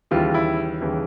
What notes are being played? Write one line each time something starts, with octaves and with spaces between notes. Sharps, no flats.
D#2 C#3 E3 G3 F4
E4
D#2 C#3 E3 G3